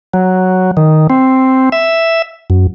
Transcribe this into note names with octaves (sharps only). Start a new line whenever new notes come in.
F#3
D#3
C4
E5
F#2